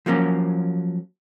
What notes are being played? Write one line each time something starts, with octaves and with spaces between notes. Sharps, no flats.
F3 F#3 A#3 C#4